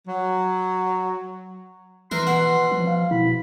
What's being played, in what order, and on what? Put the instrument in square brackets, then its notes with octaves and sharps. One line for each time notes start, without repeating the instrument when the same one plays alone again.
[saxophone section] F#3
[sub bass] E3 [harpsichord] E4 A#4 B4 [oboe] C6
[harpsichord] B2 F#5
[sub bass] F3
[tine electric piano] F5
[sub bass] B2 [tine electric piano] E4 [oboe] B5